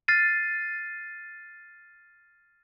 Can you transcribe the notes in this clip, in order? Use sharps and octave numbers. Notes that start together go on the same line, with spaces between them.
F6 A6 C7 D#7